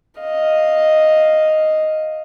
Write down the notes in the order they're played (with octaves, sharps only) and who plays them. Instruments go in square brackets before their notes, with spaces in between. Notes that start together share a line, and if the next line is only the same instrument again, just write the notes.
[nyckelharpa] D#5 F5